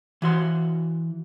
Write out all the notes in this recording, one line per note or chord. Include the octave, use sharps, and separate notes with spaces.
E3 F#4 C6